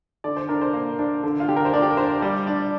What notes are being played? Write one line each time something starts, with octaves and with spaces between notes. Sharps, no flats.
D3 D5
C5
D4 A#4
C5
A#3
D4
D3
F4
D3 G4
A#4
C5
D4 D5
G4
A#4
D4 C5
G3 D5
D4 D5